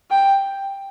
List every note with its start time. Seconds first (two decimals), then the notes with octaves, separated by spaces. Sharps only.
0.11 G5